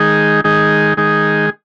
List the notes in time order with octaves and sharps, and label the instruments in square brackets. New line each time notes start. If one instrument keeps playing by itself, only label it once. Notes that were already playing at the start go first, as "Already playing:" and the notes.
Already playing: [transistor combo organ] D#3 G#3 D#4 G#4
D#3 G#3 D#4 G#4
D#3 G#3 D#4 G#4